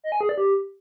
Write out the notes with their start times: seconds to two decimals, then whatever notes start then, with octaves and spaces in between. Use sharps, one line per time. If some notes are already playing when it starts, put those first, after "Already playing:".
0.04 D#5
0.12 G#5
0.21 G#4
0.29 D5
0.38 G4